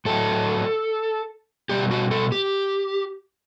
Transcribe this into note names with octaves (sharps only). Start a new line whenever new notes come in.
A2 F#3 A4
B2 G3 G4
F#4
A4
G4